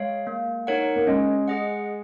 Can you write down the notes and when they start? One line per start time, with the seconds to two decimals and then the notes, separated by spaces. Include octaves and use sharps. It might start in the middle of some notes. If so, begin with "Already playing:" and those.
Already playing: G#3 C#5 F5
0.27 A#3
0.67 D#4 A#4 C#5 F#5
0.96 A#3
1.07 G#3 C#4
1.47 G#4 D#5 F#5